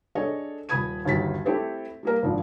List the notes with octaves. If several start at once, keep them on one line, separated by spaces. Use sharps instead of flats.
D4 G#4 A4 C#5 D#5
D#1 B5 D#6 G#6 D#7
G1 D#2 F#3 A6 B6
A3 C4 E4 G4 A4 C5
G3 A#3 A#4
G#1 F3 D4